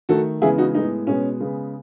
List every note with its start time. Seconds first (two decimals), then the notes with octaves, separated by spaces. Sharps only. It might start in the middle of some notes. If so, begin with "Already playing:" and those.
0.09 D#3 A3 F#4 A4
0.41 C#3 E3 G#3 B3 E4 G#4
0.58 D#4 F#4
0.74 A2 G#3 B3 D#4
1.07 B2 G#3 B3 C#4
1.40 C#3 G#3 B3